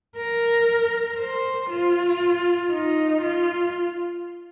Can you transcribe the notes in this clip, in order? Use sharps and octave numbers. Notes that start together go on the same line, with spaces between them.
A#4
C5
F4
D#4
F4